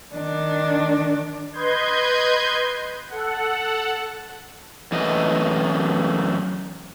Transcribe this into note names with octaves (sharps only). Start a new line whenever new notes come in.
D#3 D4
B4 D#5 C6 G6 G#6
A4 F#5
F#2 E3 A3 D#5